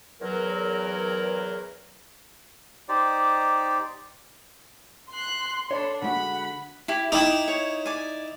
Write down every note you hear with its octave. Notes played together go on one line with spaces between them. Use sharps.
E2 F#3 A#4
D#4 G4 C5 D5
C6 F#6 C7
D4 A4 C#5 B5
D3 G#3 F#4 F#5 B5
E4 G4
D#4 E4 G5 D6
C#5
D5 G#5